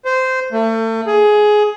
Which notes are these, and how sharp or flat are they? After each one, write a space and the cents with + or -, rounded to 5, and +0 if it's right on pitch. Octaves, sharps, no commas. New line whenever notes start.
C5 -15
A3 +35
G#4 +15